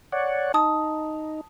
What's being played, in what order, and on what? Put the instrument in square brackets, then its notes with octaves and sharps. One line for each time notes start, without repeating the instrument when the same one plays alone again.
[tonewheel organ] C#5 D5 F#5
[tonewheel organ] D#4 [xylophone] A5 D#6